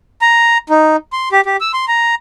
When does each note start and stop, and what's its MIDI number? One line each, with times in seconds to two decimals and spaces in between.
0.22 0.58 82
0.70 0.96 63
1.13 1.29 84
1.32 1.41 67
1.46 1.57 67
1.61 1.72 88
1.74 1.85 84
1.88 2.15 82